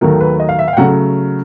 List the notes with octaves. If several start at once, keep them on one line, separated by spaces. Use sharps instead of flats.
D#2 D#3 F#3 A3 A#4
B4
D#5
F5
E5
F5
G5
C#3 F#3 A3 F#5